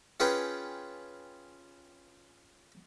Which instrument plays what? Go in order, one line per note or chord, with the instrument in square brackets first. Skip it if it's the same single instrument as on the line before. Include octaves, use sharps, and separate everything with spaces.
[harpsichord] C#4 F4 G#4 B4 G5